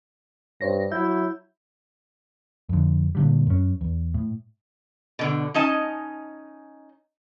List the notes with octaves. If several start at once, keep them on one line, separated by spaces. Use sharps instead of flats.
G2 C5 C#5 A#6
F#3 E4 E5 G6
F2 D3
A#2 D3 G3
F#2 C#4
E2
A2
B2 D3
C#4 D#4 D#5 A5